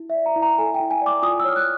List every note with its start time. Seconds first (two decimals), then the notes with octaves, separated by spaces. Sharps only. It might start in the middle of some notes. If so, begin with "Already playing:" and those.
Already playing: E4
0.10 E5
0.14 D5
0.26 A#5
0.36 E4
0.42 A#5
0.58 A4 G#5
0.74 G5
0.80 E4
0.91 G#5
1.01 D5 D6
1.23 F4 D#6
1.40 E6
1.44 C#5 F6
1.56 F#6